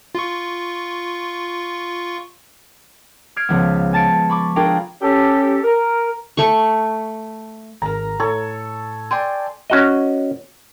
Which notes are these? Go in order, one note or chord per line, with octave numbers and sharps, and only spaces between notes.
F4 C#6
F6 G#6 C7 D7
C#2 F3 B3
G#5 A5 A6 C#7 D7
B5 C#6 D6
D4 F4 G#4 A#4 G5
C#4 G4 A4
A#4
A3 C#6
G#1 A#4 A#5
A2 A4 C#5
D5 G5 G#5 C6
C#4 F#4 D#5